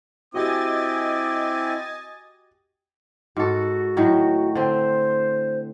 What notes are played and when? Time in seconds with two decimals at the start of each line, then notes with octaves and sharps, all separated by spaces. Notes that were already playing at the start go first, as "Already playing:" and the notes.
0.34 C4 E4 F#4 G4 D#5 G#5 D6 A6
3.37 G#2 F#4 A4
3.97 A2 D#3 F#3
4.55 D3 C4 C5